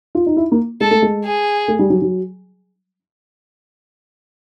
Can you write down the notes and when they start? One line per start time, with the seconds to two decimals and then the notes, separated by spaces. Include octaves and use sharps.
0.15 F4
0.26 D#4
0.37 E4
0.52 A#3
0.80 G#3 A4
0.91 A3
1.02 G#3
1.25 G#4
1.68 A3
1.79 G3
1.90 F#3
2.02 F#3